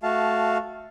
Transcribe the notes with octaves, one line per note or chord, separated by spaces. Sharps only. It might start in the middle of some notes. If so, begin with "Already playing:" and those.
A3 F#4 F5 A5